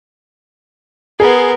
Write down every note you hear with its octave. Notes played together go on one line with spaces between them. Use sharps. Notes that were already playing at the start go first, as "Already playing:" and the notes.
B3 G#4 A#4